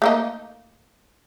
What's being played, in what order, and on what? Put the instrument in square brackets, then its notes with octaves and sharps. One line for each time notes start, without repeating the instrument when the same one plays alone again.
[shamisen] A3 A#3 D#4